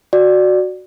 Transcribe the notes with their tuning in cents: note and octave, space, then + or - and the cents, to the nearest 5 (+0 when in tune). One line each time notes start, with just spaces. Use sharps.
F#4 +0 D5 +10